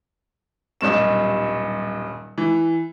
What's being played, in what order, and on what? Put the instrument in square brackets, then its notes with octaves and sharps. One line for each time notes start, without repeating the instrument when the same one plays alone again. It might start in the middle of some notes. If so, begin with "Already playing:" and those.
[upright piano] D#1 B1 G2 E7
E3